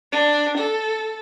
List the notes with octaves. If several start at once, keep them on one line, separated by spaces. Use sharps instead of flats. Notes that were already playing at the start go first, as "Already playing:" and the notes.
D4
A4